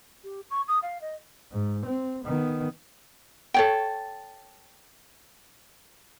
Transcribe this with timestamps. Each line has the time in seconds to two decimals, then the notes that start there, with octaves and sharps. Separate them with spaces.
0.24 G4
0.50 C#6
0.68 D#6
0.83 F5
1.02 D#5
1.52 G#2
1.86 C4
2.24 D#3 B3
3.54 A4 C#5 G5